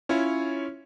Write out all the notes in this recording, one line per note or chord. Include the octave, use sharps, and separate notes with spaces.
C#4 E4 F4 C#5